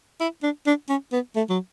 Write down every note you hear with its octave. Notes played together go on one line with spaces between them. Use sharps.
E4
D4
D4
C#4
B3
A3
F#3